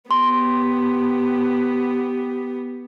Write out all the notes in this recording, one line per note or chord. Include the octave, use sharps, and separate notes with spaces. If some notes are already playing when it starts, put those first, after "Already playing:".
B3 G4 C6